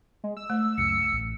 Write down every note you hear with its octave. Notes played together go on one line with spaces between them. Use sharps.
G#3
E6
A3
C#2 F#2 C#7
A1